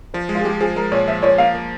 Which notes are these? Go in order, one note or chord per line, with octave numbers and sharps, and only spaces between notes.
F3 C5
G#3
F4
G#4
G#3 G4
F3 G#4
G#3 A#4
A#2 C#5
F3 E5
F3 C#5
A#3 F5
A#3